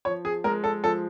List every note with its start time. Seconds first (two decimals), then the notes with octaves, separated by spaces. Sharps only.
0.05 F3 C#5
0.25 G#4
0.44 G#3 A#4
0.64 A4
0.84 F3 A4